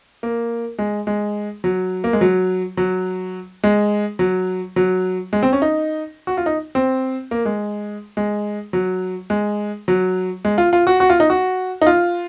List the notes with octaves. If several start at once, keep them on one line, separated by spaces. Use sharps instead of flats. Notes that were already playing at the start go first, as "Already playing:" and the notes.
A#3
G#3
G#3
F#3
A#3
G#3
F#3
F#3
G#3
F#3
F#3
G#3
C4
C#4
D#4
F#4
F4
D#4
C4
A#3
G#3
G#3
F#3
G#3
F#3
G#3
F4
F4
F#4
F#4
F4
D#4
F#4
D#4
F4